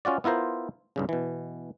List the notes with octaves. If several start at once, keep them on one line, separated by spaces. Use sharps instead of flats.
C#4 F4 F#4 D5
B3 E4 F4 A#4 C5
C2 G2 C#3
B2 E3